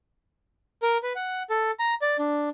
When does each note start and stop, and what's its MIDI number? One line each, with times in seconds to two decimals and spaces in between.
0.82 0.98 70
1.03 1.13 71
1.15 1.43 78
1.50 1.71 69
1.79 1.95 82
2.02 2.17 74
2.19 2.49 62